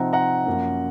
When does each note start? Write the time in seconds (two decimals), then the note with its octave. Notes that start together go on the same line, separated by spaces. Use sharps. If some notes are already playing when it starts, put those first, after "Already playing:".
Already playing: C3 F3 C4 D#4 F#5 A#5
0.13 F#5 A#5
0.46 F#2 F3 A#3 C#4